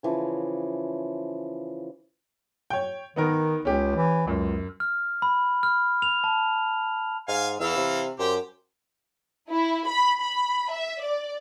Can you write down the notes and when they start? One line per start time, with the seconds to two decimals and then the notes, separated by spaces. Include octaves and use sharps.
0.03 C#3 E3 F3
2.70 C#5 G5
3.16 D#3 B3 D#4 A#4
3.65 C#2 C#4 G4
3.96 E3
4.27 C#2 F#2
4.80 F6
5.22 B5
5.63 F6
6.02 F7
6.24 A5
7.28 G#2 F5 G#5
7.60 E2 E3 F5 E6
7.77 C3
8.19 F#2 G4 C5
9.50 E4
9.88 B5
10.22 B5
10.71 E5
11.02 D5